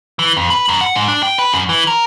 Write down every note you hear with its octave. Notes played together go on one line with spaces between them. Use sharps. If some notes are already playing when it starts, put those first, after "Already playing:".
E3
F2
B4
F#2
F#5
G#2
D4
G5
B4
F#2
E3
A#4